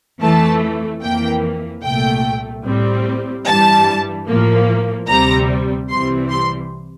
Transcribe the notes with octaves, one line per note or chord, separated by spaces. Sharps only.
F2 E3 A3 A5
F2 E3 A#3 G5
C2 A#2 A3 G5
A2 G3 C4
G2 E3 G3 A5
A2 F3 A#3
D2 C3 G3 C4 A#5
C2 C3 E3 G3 C4 C6
C6